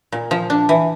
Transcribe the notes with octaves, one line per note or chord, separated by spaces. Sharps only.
A#2
F3
D4
E3